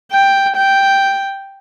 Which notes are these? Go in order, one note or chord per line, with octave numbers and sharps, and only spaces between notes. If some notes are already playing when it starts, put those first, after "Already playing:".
G5
G5